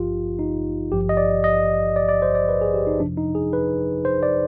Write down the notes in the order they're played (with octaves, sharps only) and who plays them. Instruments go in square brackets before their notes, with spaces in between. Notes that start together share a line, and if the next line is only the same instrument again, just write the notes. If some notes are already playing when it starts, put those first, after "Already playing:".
Already playing: [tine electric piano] G#1 G2 F3 F4 G4
D#4
G#1 G2 F3 G4
D#5
D5
D#5
D5
D5
C5
D5
B4
G#4
G4
D#4
F2 C3 F3 D4
D#4
G#4
B4
C5
D5